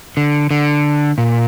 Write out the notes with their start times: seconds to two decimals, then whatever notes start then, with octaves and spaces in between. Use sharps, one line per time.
0.17 D3
0.51 D3
1.18 A#2